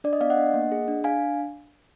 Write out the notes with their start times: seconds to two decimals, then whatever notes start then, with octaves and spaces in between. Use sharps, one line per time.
0.04 D4 D5
0.13 D#5
0.21 B3 D5 F5
0.30 D#5 F#5
0.37 D4
0.54 A#3
0.72 G#4
0.88 D4
1.04 D4 F5 G#5